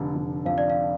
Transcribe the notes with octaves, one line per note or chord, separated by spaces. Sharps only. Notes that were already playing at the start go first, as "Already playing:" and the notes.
Already playing: F1 D3
F1
F2 F5
D5
F5